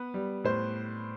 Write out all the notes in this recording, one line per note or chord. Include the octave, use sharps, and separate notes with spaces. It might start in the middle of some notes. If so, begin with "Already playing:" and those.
Already playing: B3 B4
G3
A2 C5